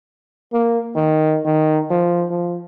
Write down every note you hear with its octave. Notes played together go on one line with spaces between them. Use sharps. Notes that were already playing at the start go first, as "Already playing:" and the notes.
A#3
D#3
D#3
F3
F3